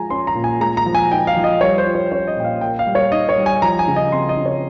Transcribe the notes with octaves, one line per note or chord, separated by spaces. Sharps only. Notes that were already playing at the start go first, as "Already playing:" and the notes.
Already playing: F3 G#3 F4 G#5 A#5
C#4 C6
A#5
A#2
G#5
G#3 A#5
A#5
F3
G#5
D#4 G5
F5
F3
D#5
G3 C#5
C5
F4
C#5
C#4 C#5
D#5
A#2 G5
F5
A#3 G5
F5
G3
C#5
D#4 D#5
C#5
G3
G#5
F3 A#5
G#5
C#3
D#5
C4 C6
D#5
C#3
C#5